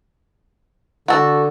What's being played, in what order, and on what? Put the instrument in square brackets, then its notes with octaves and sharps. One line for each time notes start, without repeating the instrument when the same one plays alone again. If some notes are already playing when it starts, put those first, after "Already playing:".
[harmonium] D3 [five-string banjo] F#4 A4